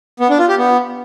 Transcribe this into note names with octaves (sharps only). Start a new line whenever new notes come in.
B3
D4
F4
G4
B3